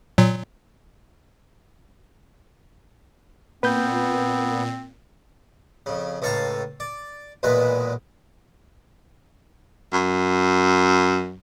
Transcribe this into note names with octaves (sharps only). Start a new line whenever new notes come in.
A#2 F#3
A#2 B3 C4 B4 G6
F2 C#3
C#2 A2 A4 F5 A5 A#5
D5
B1 E2 A#2 G#3 B4
F#2